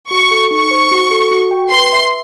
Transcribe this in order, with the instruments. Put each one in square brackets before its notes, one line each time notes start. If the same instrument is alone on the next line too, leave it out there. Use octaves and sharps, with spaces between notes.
[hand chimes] F#4 [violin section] C#6
[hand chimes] A4
[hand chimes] D#4 [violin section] C#6
[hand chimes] C5
F#4
A4
F#4
G5
[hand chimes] B4 [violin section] C6
[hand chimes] E5